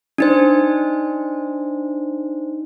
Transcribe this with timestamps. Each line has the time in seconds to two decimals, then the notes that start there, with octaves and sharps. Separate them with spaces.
0.18 D4 D#4 C5